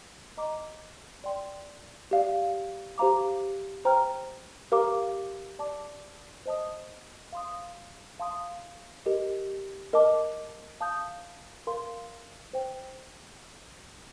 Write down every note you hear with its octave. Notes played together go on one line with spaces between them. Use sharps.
D#5 A#5 D6
D5 G5 C6
G4 D5 F5
G4 C5 F5 A#5 D6
C5 G5 A#5 F6
G4 A#4 F5 A#5 D6
D5 A5 D6
C5 D#5 A5 D#6
F5 C6 D#6
F5 A5 C6 D#6
G4 A#4 D#5
A#4 D#5 A5 D6
F5 A5 D#6 G6
A#4 F5 C6
C5 G5